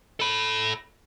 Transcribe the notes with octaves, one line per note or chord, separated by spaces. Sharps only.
A4 B5